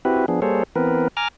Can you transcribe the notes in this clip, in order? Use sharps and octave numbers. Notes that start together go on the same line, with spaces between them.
C4 E4 F#4 G4 B4
F3 B3 D4 G#4
G3 A#3 G#4 A4 C5 C#5
E3 B3 C4 A#4 B4
G#5 A#5 D6 F6